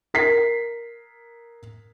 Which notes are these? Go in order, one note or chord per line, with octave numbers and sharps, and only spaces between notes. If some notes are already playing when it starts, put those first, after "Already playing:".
A#4 B6 C7